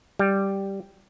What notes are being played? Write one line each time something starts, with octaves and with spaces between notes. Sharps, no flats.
G3